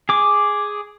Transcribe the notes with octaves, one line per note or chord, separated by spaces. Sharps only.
G#4 D6